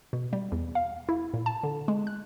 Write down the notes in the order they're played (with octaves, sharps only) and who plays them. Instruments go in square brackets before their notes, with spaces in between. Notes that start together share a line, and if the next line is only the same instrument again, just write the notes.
[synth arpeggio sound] B2
G3
E2
F5
E4
A#2
A5
D3
G#3
F#6